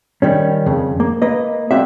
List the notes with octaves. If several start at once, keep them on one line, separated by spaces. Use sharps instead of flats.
D#3 G3 C#4
F2 C#3
A#3
A#3 B4 D#5
G3 A#3 C4 F#4 D#5 E5